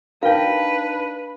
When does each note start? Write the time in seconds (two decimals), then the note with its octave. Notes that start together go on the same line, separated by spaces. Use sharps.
0.23 D4 D#4 A#4 B4 F5 G5 A5